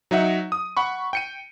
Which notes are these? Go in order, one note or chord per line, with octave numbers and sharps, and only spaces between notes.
F#3 D#4 E5 F#5
D#6
F#5 B5 C#6
G5 C#7 D#7